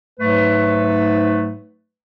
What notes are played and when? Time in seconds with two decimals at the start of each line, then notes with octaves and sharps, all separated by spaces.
0.20 G#2 F#3 A3 B4